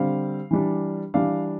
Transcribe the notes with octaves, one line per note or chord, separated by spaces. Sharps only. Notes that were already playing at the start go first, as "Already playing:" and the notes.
Already playing: D3 G3 C4 F5
E3 G3 D4
E3 G3 D4 F5